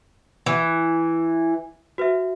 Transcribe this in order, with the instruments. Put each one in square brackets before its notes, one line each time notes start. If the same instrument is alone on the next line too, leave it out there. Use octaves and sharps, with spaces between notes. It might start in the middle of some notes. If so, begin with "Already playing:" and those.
[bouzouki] E3
[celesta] F#4 B4 E5